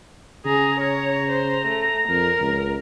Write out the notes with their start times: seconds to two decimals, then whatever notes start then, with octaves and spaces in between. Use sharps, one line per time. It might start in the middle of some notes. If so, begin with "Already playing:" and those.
0.46 C#3 G#4 A#5
0.80 C#5 A#5
1.31 C5
1.67 A3
2.08 F2 A#4
2.40 C#2